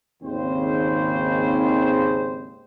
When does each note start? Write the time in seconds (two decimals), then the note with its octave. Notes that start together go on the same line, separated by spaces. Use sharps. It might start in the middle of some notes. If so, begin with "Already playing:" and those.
0.22 G#1 D#2 C#3 G#3 C4 C5